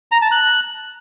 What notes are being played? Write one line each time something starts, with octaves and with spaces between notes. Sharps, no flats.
A#5
A5
F#6